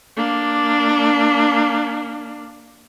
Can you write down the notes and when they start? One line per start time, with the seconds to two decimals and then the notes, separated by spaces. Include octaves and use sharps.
0.17 A#3 D4